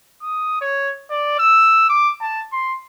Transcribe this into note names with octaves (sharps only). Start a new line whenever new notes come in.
D#6
C#5
D5
E6
D6
A5
C6